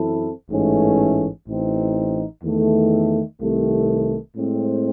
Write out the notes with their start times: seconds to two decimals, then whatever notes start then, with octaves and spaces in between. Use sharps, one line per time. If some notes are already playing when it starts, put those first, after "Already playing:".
Already playing: F#2 E3 C4 E4 A4
0.50 A1 G#2 E3 A3 C#4
1.47 A1 A2 E3 C4 D#4
2.44 E2 D#3 A3
3.40 C2 C3 D#3 A3
4.37 A2 G#3 C4